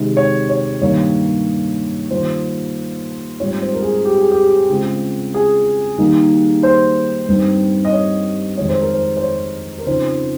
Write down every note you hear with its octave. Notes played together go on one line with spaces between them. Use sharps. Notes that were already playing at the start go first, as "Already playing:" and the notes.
Already playing: C3 D#3 G#3
C#5
C#5
G2 D#3 A#3 C#5
D#3 G3 A#3 F4 C5
G#2 G3 C4 F4 C#5
C5
A#4
G#4
G4
G#4
G4
C#3 G#3 C4 F4
G#4
D#3 G3 A#3 D#4
C5
G2 G3 C4 D#4
D#5
C#5
F2 D#3 G#3 C#5
C5
A#4
C5
C5
C#5
A#4
C#3 F3 C4 D#4 C5